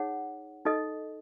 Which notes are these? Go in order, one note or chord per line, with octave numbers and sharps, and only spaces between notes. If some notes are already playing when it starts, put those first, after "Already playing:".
Already playing: D#4 G#4 C#5 F#5
D#4 A4 D#5